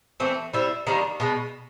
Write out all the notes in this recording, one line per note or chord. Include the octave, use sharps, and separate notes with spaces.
E3 A3 C4
G3 C4 E4
D#3 G3 A#3 D4
B2 G#3